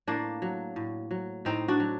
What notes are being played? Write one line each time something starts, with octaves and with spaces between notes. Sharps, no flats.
A2 A#3 D4
F#3
A2
F#3
A2 C4 D#4
D4 F#4
F#3